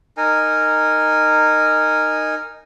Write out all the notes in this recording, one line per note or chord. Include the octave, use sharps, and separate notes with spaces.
D#4 A#4 G#5